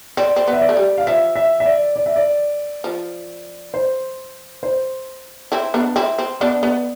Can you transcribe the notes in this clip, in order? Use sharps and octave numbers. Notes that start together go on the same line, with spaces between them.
C4 D5
C4
B3
E5
D5
A3
G3
F5
F3 E5
E5
E5
D5
D5
E5
D5
F3
C5
C5
C4 E4
B3 D4
C4 E4
C4
B3 D4 D5
B3